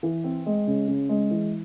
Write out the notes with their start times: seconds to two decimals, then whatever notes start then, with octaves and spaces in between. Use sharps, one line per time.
0.03 E3
0.24 C4
0.46 G#3
0.67 C#3
0.88 C#3
1.09 G#3
1.31 E3